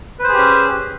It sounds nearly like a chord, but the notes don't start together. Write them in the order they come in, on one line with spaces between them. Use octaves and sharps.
B4 C5 G#4 G4 C#4